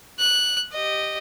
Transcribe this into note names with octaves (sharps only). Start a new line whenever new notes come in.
F#6
G4 D#5